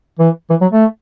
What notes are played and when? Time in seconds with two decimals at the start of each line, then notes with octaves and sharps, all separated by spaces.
0.19 E3
0.50 E3
0.61 F#3
0.72 A3